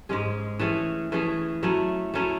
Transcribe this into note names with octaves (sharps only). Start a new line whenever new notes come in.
G#2 G#3 C#4 G#4
E3 A3 C#4 G#4
E3 A3 C#4 G#4
F#3 A3 C#4 E4
F#3 A3 C#4 E4